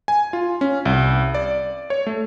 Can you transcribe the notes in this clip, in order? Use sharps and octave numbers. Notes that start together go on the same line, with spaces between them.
G#5
F4
C#4
C2
D5
C#5
A3